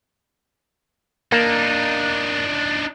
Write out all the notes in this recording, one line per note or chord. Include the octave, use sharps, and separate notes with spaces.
A#3 D4 D#4